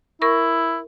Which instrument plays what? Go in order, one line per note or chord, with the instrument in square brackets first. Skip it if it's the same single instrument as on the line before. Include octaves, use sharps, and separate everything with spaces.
[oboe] E4 [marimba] A#4 C#6